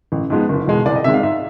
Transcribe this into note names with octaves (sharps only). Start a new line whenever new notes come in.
A1
G#2 F3 G#3 B3
F#1
E2 B2 G#3
C2 D5
D#5
C3 D#3 G#3 E5
F5
G#2 E5